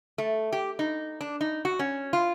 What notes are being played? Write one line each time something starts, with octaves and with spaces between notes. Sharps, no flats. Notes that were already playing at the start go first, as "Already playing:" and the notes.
A3
G4
D#4
D4
D#4
F#4
C#4
F4